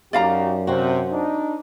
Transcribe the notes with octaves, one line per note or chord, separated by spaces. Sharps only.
F#2 D#4 F#4 G4 D5 F5 A#5
C3 C4 F#4
D4 D#4